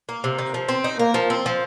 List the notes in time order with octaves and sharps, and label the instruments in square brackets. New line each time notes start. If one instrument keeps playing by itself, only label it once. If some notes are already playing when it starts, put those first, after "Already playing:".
[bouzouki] A#3
C3
D#3
F3
C4
D#4
[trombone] A#3 [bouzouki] A#4
[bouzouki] F3
C4
F3